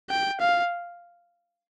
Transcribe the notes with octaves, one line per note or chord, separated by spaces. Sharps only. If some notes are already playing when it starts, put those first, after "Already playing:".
G5
F5